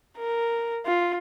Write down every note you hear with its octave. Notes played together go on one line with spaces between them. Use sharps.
A#4
F4